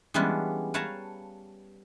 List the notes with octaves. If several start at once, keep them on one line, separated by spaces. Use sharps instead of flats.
E3 G3 G#3 B3 C#4 D4
B4 C#5 F5 A5 A#5